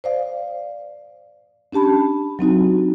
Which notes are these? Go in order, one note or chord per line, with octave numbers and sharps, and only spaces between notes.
C5 D5 F5
C#4 D4 G4 A5 B5
F#3 C4 D#4 F#4